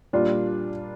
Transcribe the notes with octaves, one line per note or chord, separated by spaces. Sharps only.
A#2 G3 A#3 D4 F4